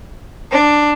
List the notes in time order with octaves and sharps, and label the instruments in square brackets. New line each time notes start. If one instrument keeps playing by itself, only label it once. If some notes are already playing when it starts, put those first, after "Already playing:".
[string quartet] D4